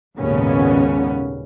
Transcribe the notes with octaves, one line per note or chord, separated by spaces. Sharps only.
G#1 D#2 A#2 C#3 B3 C#4